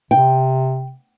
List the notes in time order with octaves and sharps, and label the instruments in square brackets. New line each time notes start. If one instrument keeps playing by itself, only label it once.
[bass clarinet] C3 [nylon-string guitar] G5